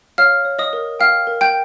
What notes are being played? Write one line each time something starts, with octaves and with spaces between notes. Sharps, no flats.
C#5 F5 F6
C#5
D#5 D#6
A#4
F5 G5 F6
A#4
G5 G6